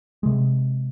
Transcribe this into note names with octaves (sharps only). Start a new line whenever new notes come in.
C3 G#3